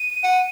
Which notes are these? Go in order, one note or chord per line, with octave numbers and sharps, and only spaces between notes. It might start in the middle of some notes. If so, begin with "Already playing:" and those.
Already playing: D#7
F#5